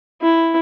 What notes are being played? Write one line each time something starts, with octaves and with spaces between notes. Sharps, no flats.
E4